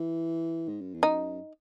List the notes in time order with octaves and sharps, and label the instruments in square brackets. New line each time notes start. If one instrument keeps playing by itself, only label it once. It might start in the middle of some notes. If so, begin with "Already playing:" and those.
Already playing: [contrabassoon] E3
G#2
F#2
E2
[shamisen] D#4
[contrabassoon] F#2